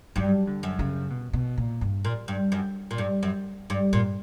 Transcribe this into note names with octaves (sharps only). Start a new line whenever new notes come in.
G2 F#3
D3
F#2
C#3
B2
B2
A#2
G2
A#2
G2
F#2
A#2
G2
F#2
G2
G2 A#2